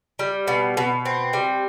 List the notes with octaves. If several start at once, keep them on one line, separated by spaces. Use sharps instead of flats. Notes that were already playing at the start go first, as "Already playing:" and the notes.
G3
B2
B2
C4
G3